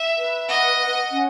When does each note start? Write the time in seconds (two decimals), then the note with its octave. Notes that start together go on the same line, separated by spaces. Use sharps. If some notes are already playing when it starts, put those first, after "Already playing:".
Already playing: E5
0.17 B4
0.49 D#5 F#5
0.79 F#5
1.11 C#4